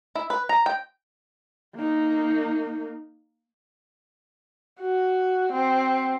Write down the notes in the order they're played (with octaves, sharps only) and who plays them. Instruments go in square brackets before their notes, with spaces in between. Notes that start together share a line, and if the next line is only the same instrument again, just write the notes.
[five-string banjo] E4
B4
A#5
G5
[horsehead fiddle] A#3 D#4
[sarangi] F#4
C4